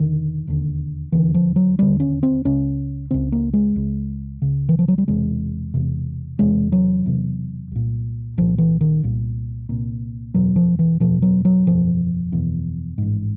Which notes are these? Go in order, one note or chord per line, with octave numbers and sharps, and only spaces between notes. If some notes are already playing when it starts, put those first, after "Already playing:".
Already playing: E1 D3 D#3
E1 D#2 D3
E1 D#2 D3 E3
F3
F#3
E1 D#2 D3 G3
C#4
C4
C#2 C#3 C#4
C#2 C#3 C4
A#3
G#3
C#2 C#3
C#2 C#3
E3
F3
F#3
G3
E1 E2 C3 G#3
E1 E2 C3
E1 E2 C3 G#3
F#3
E1 E2 C3
C2 A#2
C2 A#2 F3
E3
D#3
C2 A#2
C2 A#2
F#1 E2 B2 F#3
F3
E3
F#1 E2 B2 F3
F#3
F#3
F#1 E2 B2 F3
F#1 E2 B2
A1 G#2